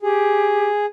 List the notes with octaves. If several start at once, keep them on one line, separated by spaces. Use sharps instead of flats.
G4 G#4